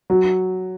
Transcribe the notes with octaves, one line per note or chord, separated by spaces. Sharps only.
F#3